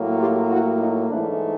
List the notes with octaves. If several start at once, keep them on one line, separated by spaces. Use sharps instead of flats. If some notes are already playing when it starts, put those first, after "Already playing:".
Already playing: A2 F#3 A#3
F4 G4
E4 F#4
D#4 F4
G#2 E3 A3 D4 E4